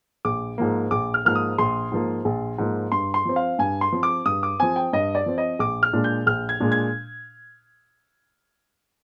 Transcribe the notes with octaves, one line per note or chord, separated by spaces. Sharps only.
A#1 D6
G#2 F3 A#3
A#1 D6
F6
G#2 F3 A#3 F6
D#6
A#1 C6
G#2 F3 A#3
A#1
G#2 F3 A#3
G2 C6
C6
F3 C4
F5
G2 G#5
C6
F3 C4
D6
G2 D#6
D6
F3 C4 G#5
G5
G2 D#5
D5
F3 C4
D#5
A#1 D6
F6
A#2 G#3 D4
G6
A#1 F6
G#6
A#2 G#3 D4
G#6